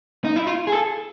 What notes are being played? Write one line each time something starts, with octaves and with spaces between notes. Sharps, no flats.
D#4
E4
F4
G#4
A4